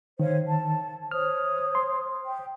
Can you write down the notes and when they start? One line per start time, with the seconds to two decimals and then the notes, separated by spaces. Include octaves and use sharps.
0.20 D#3 C5 C#5 F5
0.47 A5
1.11 C5 C#5 D#6 F6
1.75 C6
2.24 G5